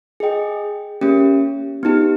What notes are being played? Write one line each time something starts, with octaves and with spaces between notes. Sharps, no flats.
G#4 D#5 G5
A#3 C#4 G4
B3 D#4 G4